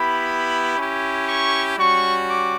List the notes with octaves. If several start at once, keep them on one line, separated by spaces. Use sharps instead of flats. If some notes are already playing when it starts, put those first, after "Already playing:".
Already playing: B3 E4 G4 B5
C#4 E4 G4
C#6
G3 C#4 F#4 C#6
D6